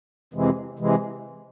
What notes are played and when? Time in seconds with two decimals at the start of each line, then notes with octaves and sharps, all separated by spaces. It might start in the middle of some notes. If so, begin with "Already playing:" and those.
0.34 F2 C3 E3 G#3
0.79 C3 E3 G#3